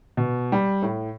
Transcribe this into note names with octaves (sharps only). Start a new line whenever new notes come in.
B2
G3
A2